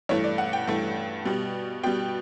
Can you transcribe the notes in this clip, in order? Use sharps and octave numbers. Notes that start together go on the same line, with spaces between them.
G2 E3 A3 C#5
D5
F#5
G5
G2 E3 A3
B2 G3
B2 G3 G5